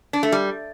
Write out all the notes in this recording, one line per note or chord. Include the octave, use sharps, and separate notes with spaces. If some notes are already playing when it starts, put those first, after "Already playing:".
D4
A3
G3